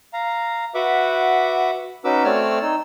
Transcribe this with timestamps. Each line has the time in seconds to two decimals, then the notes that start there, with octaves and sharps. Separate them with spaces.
0.13 F5 A#5
0.75 F#4 B4 E5 F#5 D6
2.05 C#4 D#4 F#4 B4 D6 E6
2.24 A3 C4 C#5 D5 E6 F6
2.62 D#4 E6